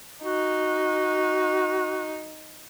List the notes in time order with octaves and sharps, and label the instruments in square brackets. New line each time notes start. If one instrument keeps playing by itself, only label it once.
[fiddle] D#4 [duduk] F#4